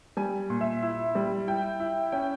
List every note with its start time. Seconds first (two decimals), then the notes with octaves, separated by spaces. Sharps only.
0.17 G3 G#5
0.50 A#2
0.61 E5
0.82 E4
1.15 G3
1.47 E4 G5
1.80 E4
2.12 C#4 G5